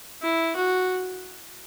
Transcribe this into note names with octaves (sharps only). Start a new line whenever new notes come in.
E4
F#4